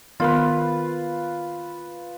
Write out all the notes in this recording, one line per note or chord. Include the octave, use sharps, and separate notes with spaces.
D#3 B3 F4 A#4 B4